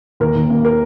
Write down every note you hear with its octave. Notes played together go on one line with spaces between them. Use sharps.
D#2 A#4
D#2
A#3
A#4